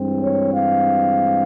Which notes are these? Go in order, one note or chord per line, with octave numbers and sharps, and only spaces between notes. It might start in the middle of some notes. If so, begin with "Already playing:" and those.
Already playing: G2 E3 G#3 C4
C#5
F5